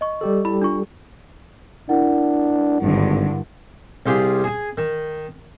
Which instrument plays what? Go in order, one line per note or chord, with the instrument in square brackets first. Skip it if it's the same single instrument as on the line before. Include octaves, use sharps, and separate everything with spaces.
[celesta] D#5 C#6
[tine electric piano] G3 G4 A4
[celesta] E4 B5
D4 F4 C#6
[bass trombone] D4 [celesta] E4 A#4 F#5
[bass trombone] G#1 [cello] G2 D3
[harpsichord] C2 F4 G4 G#4
G#4 G#5
D#3